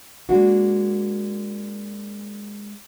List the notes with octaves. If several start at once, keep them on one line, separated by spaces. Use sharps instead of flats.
G#3 A#3 D4 F#4